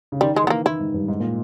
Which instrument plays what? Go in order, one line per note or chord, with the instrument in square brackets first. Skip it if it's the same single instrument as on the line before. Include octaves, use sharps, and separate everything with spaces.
[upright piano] C#3
[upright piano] D#3 [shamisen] G3
[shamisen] G#3
[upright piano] E3
[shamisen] B3
A#3
[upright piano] D#3 [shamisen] E4
[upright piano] G#2
G2
G#2
A#2